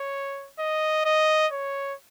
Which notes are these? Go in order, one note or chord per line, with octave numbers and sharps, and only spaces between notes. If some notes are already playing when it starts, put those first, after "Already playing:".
Already playing: C#5
D#5
D#5
C#5